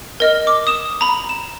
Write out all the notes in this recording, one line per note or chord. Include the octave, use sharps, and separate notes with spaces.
A#4 D#5 F6
D6
D#6 E7
A#5 B5
E7